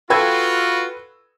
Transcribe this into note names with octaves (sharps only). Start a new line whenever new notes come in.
F4 F#4 A4 B4 G5 E6 G#6